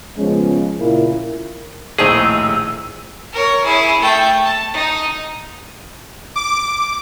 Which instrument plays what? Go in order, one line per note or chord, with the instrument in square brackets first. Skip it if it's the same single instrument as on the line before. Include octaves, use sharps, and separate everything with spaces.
[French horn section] C#3 F3 G#3 B3 C#4
A#2 C#3 A#3 E4 A#4
[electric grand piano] A#1 D#2 A2 [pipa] A3 C4 D#4 [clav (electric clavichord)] G#4 [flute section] E6
[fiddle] A#4 C#5
E4 G#4
A3 G5
A5
D#4
[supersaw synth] D6